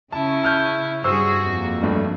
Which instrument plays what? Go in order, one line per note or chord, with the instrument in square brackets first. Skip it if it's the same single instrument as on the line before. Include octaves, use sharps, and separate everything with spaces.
[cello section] C#3 C#4 [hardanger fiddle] E4 [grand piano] A5
[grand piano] A5 F6 G6
[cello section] G2 G#4 [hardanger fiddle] F#4 [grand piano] C5 C#6 E6
[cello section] F2 A#3
[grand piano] G2 A3 D4